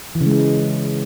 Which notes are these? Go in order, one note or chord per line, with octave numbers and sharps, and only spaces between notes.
E3
C#3
G#3